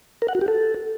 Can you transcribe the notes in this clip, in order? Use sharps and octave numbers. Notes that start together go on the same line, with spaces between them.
A#4
F#5
F#4
G4
A4